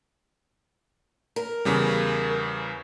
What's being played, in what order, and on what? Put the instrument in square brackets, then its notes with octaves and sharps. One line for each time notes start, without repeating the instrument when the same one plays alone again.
[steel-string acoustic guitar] A#4
[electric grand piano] E2 C#3 G3